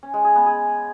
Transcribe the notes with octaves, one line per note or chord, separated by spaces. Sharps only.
C#4
G#3
G#4
B3
G#4